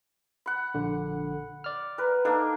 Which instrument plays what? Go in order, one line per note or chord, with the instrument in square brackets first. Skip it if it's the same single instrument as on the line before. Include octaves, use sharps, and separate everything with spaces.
[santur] F#5 B5
[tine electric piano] A#1 D3
D5 F6
[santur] A#4 B4
[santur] A#3 D4 [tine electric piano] D#4 A4